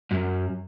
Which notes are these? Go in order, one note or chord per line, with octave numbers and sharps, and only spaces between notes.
F#2